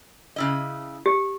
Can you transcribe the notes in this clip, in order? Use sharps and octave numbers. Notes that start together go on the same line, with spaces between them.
C#3 E4 D#5
G4